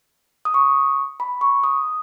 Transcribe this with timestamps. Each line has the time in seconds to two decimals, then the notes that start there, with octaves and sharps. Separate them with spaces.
0.45 D#6
0.54 C#6
1.20 B5
1.41 C#6
1.64 D#6